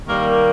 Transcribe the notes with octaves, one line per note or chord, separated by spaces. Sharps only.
D#3 G3 A#3 A#4